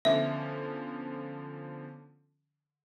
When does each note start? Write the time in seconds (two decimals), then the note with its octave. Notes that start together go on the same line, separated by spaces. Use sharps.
0.05 D3 F3 B3 C#4 A4 E5 D6